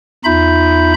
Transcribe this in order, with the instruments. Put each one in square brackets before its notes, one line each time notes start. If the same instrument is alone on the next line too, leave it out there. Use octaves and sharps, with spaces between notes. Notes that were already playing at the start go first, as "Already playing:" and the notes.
[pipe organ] E2 D#4 F4 E5 B5 G6